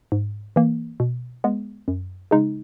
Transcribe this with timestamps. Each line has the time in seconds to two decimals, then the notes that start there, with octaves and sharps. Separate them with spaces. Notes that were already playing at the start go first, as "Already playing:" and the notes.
0.12 G#2
0.56 E3 A#3
1.00 B2
1.44 G#3 B3
1.88 F#2
2.31 C#3 G#3 D#4